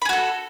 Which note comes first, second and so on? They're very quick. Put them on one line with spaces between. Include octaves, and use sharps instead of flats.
B5 G#4 F#4 A4